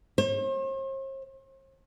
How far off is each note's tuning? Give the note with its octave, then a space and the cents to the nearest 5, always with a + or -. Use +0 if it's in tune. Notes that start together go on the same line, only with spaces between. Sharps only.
C5 +45